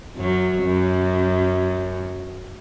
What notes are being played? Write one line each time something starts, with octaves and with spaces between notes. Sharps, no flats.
F#2 F#3
F#2